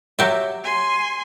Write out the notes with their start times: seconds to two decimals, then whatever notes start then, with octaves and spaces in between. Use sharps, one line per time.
0.19 F#3 G4 E5
0.64 G#5 C6